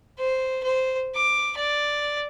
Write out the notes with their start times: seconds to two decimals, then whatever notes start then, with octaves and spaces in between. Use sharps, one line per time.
0.19 C5
0.63 C5
1.15 D6
1.57 D5